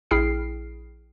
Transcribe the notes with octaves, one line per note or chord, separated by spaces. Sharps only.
A#1 E4 G#4 G5 F6 C7